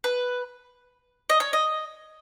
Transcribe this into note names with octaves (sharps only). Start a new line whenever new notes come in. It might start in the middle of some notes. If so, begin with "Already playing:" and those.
B4
D#5
C#5
D#5